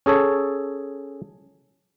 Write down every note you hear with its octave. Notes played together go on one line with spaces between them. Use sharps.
C#4 G#4 A4 C#5